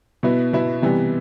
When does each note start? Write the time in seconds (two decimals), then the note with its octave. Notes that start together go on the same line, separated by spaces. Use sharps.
0.23 B2 B3 E4
0.53 B2 B3 E4
0.82 C3 E3 G3 B3